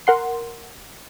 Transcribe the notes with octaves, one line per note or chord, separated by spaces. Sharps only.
A#4 F#5 C6